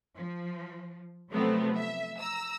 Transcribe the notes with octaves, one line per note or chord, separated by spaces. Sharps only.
F3
C3 F3 F#3 A3 B3 C4
E5
A#5 E6